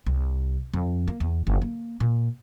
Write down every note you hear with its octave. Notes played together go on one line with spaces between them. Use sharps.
C2
F2
A#3
E2
F#1
A#3
A#2